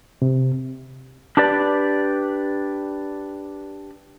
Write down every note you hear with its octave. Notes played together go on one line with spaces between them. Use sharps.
C3
D4 G4 B4 D5